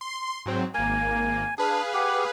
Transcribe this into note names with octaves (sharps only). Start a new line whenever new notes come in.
C6
G#2 F#3 C4
G#1 A#3 G#5
D4 G#4 B4 F5
G4 F#5